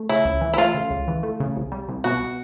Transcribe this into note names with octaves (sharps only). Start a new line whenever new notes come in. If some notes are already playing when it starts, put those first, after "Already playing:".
Already playing: A3
C#3 E4
C#2
E3
E4
A3 F4
C#3
C#2
E3
A3
C#3
C2
G3
C2
B2 F#4